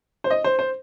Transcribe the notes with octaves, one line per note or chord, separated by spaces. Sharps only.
C5
D#5
C5
C5